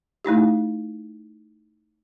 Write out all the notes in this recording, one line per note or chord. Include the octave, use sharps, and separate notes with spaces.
A3 D#4 E4 G4